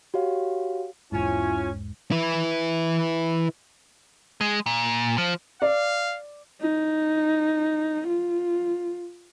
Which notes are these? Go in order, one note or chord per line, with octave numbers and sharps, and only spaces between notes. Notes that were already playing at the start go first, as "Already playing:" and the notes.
F#4 G4 C#5 F5
E1 B1 G#2 C#4 E4 F4 G#5
E4 B4
G#3
A#2
F3
D5 F5
D#4
F4